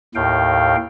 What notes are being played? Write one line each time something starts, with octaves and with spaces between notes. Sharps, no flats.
D#2 A2 F5 G5